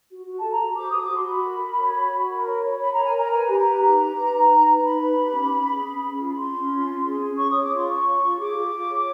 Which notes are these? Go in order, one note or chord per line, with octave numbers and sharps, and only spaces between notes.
F#4
F#4
A4 A5
A#5
F#4
C5 D6
F#4 D#6
D6
F#4 C6
F#4 B5
A#4
A#4
C#5
F#4
F#4
A#4
C#5
C#5
C#5 B5
A#4 A#5
G#5
A#4 A#5
B4 G#5
G4 B5
A#5
B4
D#4 A#5
G4
B4
D#4
D#4
B4
D#4 B5
B4
G4
C#4
C#4
G#4
C#4
C#4
F4
F4 C6
C#4
F4
C#4
G#4
C#4
C#5 C#6
C#5 D#6
D6
F4 C6
C#5 C#6
F4
F4
G#4 D6
F4
F4
C#5